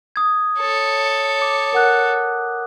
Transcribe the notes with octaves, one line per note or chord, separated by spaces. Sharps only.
D#6 G#6
A4 C#5
D6
A#4 F#5 F#6